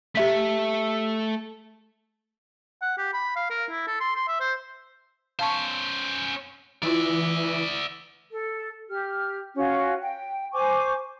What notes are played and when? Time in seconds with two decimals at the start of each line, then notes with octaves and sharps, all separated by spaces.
0.15 A3 G4 E5 B6
2.82 F#5
2.98 G4
3.13 B5
3.36 F5
3.50 A#4
3.70 E4
3.87 A4
4.00 C6
4.15 C6
4.28 E5
4.40 C5
5.39 C#4 C5 F5 A5 C#6
6.83 E3 E4 F4 D5 E5
8.30 A4
8.89 G4 F6
9.55 C#4 F4 F#4
10.01 G5
10.53 C5 G#5 C#6 D6